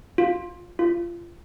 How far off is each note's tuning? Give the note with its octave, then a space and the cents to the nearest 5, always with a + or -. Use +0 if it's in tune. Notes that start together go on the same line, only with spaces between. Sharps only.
F4 +10
F4 -25